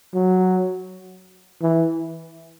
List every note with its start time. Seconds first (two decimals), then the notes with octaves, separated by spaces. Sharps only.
0.14 F#3
1.62 E3